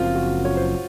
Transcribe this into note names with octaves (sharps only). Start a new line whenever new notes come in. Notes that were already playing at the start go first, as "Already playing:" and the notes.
Already playing: F#1 F#2 F3 C4 F4
F#4
C#5
C5